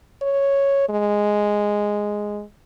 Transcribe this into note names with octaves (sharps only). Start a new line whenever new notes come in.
C#5
G#3